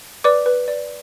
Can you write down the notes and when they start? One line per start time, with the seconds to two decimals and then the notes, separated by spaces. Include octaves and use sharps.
0.24 B4 D5 D6
0.46 B4
0.68 D5